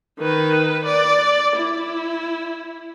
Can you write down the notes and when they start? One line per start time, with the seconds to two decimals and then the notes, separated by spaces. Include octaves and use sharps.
0.19 D#3 B4
0.85 D5
1.56 E4